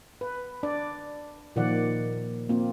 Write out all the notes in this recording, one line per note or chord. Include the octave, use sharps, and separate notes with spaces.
B4
D4 D5
A#2 D#3 F3 D5 F#5
A#3 C4 F4